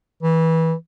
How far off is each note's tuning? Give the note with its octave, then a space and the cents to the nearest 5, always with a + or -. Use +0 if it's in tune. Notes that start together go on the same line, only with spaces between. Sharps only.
E3 -20